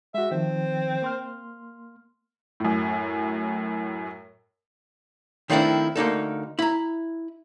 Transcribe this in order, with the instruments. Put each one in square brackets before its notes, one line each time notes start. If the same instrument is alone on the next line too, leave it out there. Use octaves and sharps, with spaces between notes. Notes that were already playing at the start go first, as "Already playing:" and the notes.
[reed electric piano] G#3 F#4 [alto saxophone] E5
[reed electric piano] D#3 F3 [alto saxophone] C4
[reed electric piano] A#3 C6 F6
[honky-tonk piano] F#2 A2
[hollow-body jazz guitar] D#3 F3 A3 C4 D4 E4
D2 A#3 D#4 A4
E4 A#5